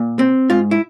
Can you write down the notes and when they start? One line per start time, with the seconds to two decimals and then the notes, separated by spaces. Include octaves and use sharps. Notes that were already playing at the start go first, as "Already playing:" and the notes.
Already playing: A#2
0.19 C4
0.50 G#2 F4
0.71 E4